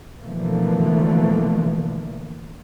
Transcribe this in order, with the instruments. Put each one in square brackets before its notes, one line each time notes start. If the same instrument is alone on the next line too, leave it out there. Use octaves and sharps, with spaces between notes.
[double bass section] B2 D3 E3 F3 A3 A#3